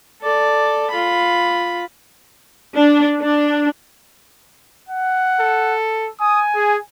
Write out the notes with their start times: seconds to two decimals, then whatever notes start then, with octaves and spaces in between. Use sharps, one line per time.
0.22 A4 D5
0.91 F4 B5
2.75 D4
3.21 D4
4.89 F#5
5.40 A4
6.20 G#5 D#6
6.55 G#4